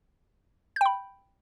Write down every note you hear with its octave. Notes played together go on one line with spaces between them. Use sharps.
G5 B5 G6